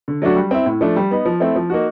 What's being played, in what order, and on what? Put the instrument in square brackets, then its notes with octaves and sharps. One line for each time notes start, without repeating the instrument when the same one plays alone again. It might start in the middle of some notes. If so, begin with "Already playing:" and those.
[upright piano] D3
F#3 A3 D4 F#4
G3
C4 E4
A2
F3 A3 D4
G3
B3 D#4
F3
A3 C4 E4
F3
A#3 D#4 F#4